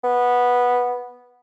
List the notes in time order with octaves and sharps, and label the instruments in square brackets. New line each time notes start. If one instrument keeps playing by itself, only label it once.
[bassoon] B3